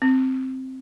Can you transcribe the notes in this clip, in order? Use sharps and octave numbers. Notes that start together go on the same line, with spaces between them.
C4